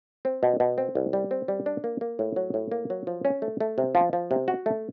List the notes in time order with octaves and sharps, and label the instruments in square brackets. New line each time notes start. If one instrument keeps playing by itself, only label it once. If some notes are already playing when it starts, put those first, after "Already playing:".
[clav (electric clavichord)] C4
B2
B2
C4
C2
G3
C4
G3
D4
A#3
A#3
A2
F#3
A2
A#3
F#3
F3
C#4
A3
A3
C3
F3
F3
C3
F#4
A3